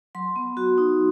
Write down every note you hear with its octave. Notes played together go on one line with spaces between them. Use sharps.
F#3 C6
B3
F#4
D#4